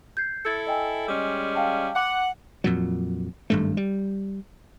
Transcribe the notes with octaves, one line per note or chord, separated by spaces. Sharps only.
G6 G#6 C7
E4 A4 G#6 A6 C#7
D#5 G5 G#5
G3 G#3 C#4
F5 G5 A5
F#5 C6 D6
F2 A#2 F#3
G#1 G2 A3
G3